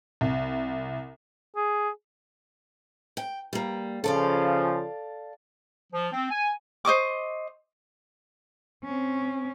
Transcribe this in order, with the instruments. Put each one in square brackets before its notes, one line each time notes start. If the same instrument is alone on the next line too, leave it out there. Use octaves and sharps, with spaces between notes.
[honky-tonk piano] C2
[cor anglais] G#4
[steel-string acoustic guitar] G5
G3 A#3
[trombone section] C#3 F3 [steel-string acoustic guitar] A4 D5 F5
[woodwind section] F3
C4
G#5
[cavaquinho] C5 D#5 C#6 D6
[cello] C4 C#4